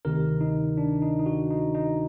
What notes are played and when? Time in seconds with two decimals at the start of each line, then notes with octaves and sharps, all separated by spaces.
0.05 D2 C3 D#3 A#4
0.41 D#4
0.77 D4
1.02 D#4
1.19 D#4
1.26 F#4
1.50 D#4
1.74 D#4